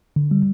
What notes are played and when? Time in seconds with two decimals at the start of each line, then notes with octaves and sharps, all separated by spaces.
0.16 D3
0.31 G3